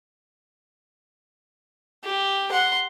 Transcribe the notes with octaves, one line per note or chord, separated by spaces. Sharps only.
G4
F#5 C6